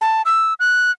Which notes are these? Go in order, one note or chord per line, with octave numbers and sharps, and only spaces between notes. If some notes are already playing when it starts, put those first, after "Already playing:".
A5
E6
F#6